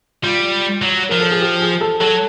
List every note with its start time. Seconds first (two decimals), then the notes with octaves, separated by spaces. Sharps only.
0.23 G3 F4
0.82 F#3
1.09 F3 A#4
1.20 A4
1.31 G#4
1.41 G4
1.61 G#4
1.81 A4
2.00 F#3 A4